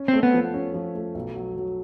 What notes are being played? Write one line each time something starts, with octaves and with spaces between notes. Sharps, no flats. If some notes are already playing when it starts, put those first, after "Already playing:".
Already playing: C#4
C4
A3
B3
F3
C#4
F3
A3
B1
F#3
F#3